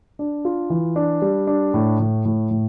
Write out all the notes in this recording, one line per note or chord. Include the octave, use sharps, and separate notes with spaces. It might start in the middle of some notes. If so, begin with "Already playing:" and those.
D4
F4
E3
D4
G3
D4
A2
A2
A2
A2